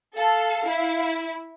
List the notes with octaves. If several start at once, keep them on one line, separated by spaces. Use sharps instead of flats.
A4 F5
E4